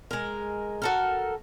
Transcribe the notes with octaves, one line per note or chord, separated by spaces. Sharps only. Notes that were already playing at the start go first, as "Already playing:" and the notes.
G#3 A#4
F#4 A4 A#4